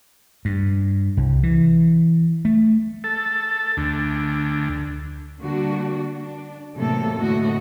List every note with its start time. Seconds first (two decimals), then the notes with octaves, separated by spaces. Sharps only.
0.45 G2
1.17 C2
1.43 E3
2.45 A3
3.04 A4
3.77 D2
5.41 D3 G3 A#3 D4 F#4
6.17 D4
6.77 E2 A2 C3 F#3 A#3 A4
7.17 A2 D3 F#4 D#5